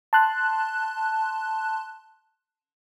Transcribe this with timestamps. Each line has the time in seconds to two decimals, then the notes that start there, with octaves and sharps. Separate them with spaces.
0.13 A5 C6 F#6